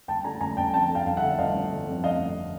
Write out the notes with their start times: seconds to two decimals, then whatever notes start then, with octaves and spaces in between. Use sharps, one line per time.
0.08 G1 G5 A5
0.24 D3 G#5 A#5
0.40 G1 G#5 A#5
0.57 G1 G5 A5
0.73 F2 G5 A5
0.89 D3
0.95 F5 G5
1.06 G1 F5
1.17 E5 F#5
1.22 D3
1.38 G1 D#5 F5
1.54 G1
1.71 D3
1.88 F2
2.04 F2 D#5 F5
2.20 G1